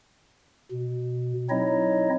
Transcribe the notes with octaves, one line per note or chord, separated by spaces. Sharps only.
B2
F#3 C4 D#4 E4 C#5 D#5